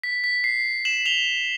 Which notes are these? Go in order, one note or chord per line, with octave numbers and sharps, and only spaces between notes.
B6
B6
C7
E7 F#7
F7 G7